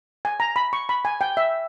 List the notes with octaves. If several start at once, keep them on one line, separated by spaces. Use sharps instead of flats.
G#5
A#5
B5
C#6
B5
G#5
G5
E5